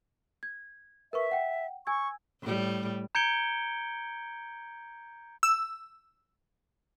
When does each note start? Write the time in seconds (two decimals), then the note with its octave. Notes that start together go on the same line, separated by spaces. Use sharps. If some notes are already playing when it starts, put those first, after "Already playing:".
0.43 G#6
1.13 A#4 B4 E5 C#6
1.32 F#5 G5
1.87 G#5 C#6 E6 G#6
2.42 A2 G3
3.15 A#5 G6 G#6 C#7 D7 G7
5.43 E6